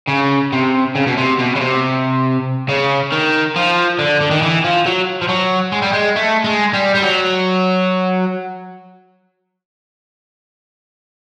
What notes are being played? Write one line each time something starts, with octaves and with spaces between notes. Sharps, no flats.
C#3
C3
C#3
B2
C3
B2
C#3
C3
C#3
D#3
F3
D3
D3
D#3
E3
F3
F#3
F3
F#3
G#3
G3
G#3
A3
G#3
G3
G3
F#3